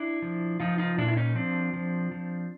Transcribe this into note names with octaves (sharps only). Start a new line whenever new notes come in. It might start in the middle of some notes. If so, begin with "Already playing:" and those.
Already playing: D4 E4
F3
F3 D#4 F4
D#4 F4
A#2 D4 E4
E4
C#4 D#4
F3 C4 D4
F3
F3